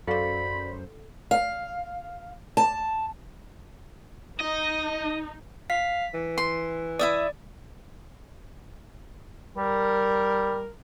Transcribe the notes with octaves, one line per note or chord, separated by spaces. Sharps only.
F#2 F#4 A4 C5 D5 F5 B5
F5
A5
D#4 D#5
F5 B6
E3
C6
E4 D5 E5 D#6
G3 A#4